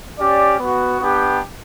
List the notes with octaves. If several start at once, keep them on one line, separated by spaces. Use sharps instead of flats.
C#4 G4 D5
B3 F#4
B3 D4 G4